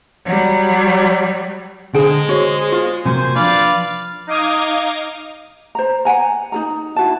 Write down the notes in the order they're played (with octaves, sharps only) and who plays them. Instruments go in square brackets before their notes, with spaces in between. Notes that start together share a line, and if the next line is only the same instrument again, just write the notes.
[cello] F#3 G3
[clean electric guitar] D3 [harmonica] G#3 [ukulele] G#4 C5 G5
[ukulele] F#4 C#5 [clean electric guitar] G#4 C5
[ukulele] F4
[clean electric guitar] C3 F#3 A#3 [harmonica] C5 G#5
[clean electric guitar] F3 D4 [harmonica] B4 D5 F5
[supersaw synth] D#4 D#5 F5 D6 D#6 G#6
[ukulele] C5 A#5
F#5 G#5 A#5
D#4 G#4 A#5
E4 F#4 A5